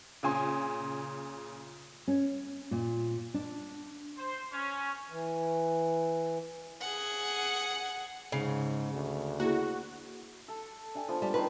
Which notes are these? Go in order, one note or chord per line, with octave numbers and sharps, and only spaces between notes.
A#2 C#3 G#5 C6
C#4
A#2
D4
C5
C#4
E3
G#4 F#5
G#2 C#3
D2
A#3 E4 F#4 G#4
A4
D4 G5 G#5
F3 B3 D4
G3 A5
D#3 G3 B4 C6